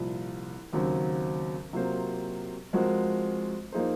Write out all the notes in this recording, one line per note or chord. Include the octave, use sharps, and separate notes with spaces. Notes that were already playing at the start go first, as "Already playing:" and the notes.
Already playing: C2 A#2 F3
D#2 C#3 F#3 C4
C3 F#3 A#3 F4 C5
F3 G#3 C4 F#4 A#4
F3 A#3 D#4 G#4 C5